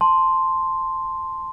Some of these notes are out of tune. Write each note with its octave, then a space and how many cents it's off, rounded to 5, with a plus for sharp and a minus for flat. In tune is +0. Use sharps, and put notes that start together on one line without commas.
A5 +0 C6 +0